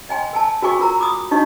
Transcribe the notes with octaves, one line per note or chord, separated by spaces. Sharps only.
D#5 G5 G#5 C6
A#4 G#5 A5
F#4 A#4 G5 G#5 C#6 D6
F4 A#4 A#5
B5 D6 D#6
D4 D#4 F#4 D#5 C#6